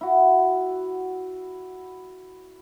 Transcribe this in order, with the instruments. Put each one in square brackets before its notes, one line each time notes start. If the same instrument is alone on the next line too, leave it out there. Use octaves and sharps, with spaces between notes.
[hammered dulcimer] E4 F#4